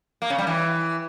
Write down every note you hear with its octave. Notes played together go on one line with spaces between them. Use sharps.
A#3
C#3
G3
E3